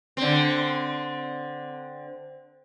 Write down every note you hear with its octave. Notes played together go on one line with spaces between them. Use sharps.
D3 C4